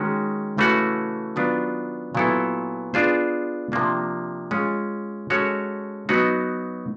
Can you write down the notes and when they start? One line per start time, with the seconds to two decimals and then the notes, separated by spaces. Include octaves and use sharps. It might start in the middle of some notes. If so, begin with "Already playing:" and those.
Already playing: D#3 G#3 C#4 F#4
0.58 C#3 E3 A3 C#4 F#4
1.36 D#3 F#3 B3 D4 F4
2.15 A#2 F#3 B3 E4 A4
2.94 B3 D4 F4 G#4 C5
3.72 C3 F3 A#3 D4
4.51 G#3 C#4 F4
5.30 G#3 C#4 F#4 A4 C#5
6.09 F#3 B3 D#4 F#4